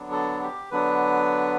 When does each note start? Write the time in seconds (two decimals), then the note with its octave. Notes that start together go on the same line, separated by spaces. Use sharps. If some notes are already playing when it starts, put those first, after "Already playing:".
Already playing: D3 F#3 B3 D4
0.11 A4
0.42 G4
0.71 D3 F#3 B3 D4 B4